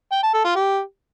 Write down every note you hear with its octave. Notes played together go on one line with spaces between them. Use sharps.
G5
A5
A4
F4
G4